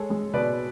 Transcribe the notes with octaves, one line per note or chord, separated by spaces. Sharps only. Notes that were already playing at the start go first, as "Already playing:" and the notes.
Already playing: G#3 A4 C#5
G#3
B2 B4 D5